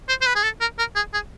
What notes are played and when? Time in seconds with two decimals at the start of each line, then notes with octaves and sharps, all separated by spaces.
0.09 C5
0.21 C5
0.27 B4
0.35 G#4
0.43 A4
0.61 A#4
0.79 A#4
0.96 G#4
1.13 G#4